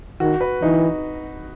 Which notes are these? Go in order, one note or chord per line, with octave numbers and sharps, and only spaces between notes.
D#3 F#4
B4
E3 D#4